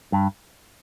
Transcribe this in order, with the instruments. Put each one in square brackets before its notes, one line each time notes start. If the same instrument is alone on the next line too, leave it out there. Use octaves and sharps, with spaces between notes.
[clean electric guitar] G2